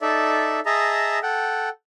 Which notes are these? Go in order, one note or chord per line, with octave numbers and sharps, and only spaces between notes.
D#4 A4 D5 E5
G#4 D#5 E5 A5 A#5
A4 F#5 G5